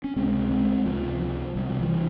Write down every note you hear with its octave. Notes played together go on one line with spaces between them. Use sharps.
C#4
C#2 C3 G#3 C4
G#3 C4
C#2 C3 F3
F3
C2 C3 G3
F3
E3 G3